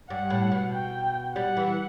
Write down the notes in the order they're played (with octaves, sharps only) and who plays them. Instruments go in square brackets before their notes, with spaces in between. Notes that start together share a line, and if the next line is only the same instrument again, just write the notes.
[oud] G2 [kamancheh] F#5
[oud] A2
B2
[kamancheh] G5
[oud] G3 [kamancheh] F#5
[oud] E3